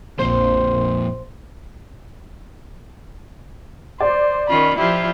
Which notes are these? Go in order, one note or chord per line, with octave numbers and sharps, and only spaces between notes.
A#1 F2 A#2 C5
C5 D5
D#3 C#4 F4 B5
F3 E4 F4 G4